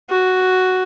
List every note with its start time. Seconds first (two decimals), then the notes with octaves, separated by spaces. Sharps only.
0.10 F#4